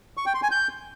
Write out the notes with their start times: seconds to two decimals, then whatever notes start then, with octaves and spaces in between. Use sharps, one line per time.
0.17 C#6
0.26 G5
0.34 C6
0.43 G#5
0.51 G6